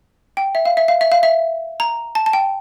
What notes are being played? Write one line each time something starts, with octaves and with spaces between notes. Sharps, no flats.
G5
E5
F5
E5
F5
E5
F5
E5
A#5
A5
A5
G5